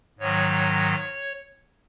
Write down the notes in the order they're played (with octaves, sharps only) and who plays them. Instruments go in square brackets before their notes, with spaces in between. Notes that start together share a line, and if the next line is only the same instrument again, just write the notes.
[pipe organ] G#2 D#3 F#3 C#5